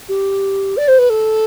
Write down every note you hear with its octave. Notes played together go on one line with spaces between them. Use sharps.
G4
D5
C5
B4
A4